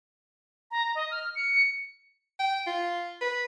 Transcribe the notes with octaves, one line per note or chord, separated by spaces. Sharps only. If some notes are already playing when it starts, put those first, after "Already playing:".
A#5
D#5
F6
C#7
G5
F4
B4